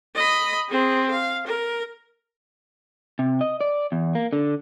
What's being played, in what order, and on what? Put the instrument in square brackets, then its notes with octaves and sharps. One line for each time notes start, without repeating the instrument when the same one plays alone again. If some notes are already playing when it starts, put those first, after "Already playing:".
[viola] D#5 B5
C4 G#4
F5
A#4
[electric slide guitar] C3
D#5
D5
E2
A#3
D3